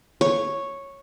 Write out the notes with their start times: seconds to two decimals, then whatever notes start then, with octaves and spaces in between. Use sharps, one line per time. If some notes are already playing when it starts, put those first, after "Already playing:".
0.21 C#5